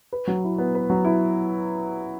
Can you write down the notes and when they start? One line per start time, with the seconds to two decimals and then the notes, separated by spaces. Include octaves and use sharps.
0.13 B4
0.27 F#3
0.44 E4
0.58 B3
0.75 B4
0.90 F#3
1.05 E4